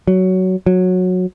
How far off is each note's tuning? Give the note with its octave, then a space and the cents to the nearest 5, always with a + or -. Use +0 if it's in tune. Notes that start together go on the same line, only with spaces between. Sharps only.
F#3 +10
F#3 -15